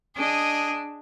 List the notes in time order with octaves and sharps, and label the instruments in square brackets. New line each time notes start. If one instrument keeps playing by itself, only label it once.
[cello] D4 [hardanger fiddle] G#4 D#5